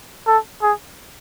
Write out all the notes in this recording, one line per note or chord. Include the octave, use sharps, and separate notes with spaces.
A4
G#4